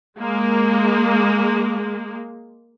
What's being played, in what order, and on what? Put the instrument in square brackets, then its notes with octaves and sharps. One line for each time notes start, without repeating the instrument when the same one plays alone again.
[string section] G#3 A#3